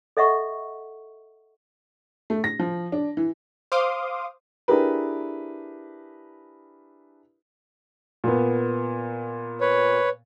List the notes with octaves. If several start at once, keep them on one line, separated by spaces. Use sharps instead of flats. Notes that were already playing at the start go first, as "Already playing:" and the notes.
A4 D#5 E5 F#5 C#6
A3
A#6
F3
D4
E3
C5 F5 C6 D6 D#6
D4 E4 G4 G#4 A#4 B4
A#2 A#3 B3
B4 C#5